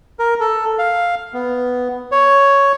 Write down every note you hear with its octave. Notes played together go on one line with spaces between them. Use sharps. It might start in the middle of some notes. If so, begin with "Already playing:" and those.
A#4
A4
F5
B3
C#5